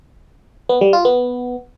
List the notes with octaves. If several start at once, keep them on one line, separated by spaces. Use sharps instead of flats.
B3
G3
F4
B3